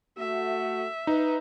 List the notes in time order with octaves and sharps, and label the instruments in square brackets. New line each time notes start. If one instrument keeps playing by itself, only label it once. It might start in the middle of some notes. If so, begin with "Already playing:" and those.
[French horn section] A3 F#4 [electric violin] E5
[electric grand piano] D#4 [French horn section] B4